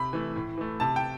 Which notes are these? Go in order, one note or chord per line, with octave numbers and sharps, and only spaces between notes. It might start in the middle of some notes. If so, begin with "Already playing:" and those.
Already playing: C3 B5
E3 A3
A2
E3 A3
C3 A5
G5